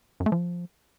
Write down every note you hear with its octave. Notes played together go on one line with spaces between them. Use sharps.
F#2
A3
F3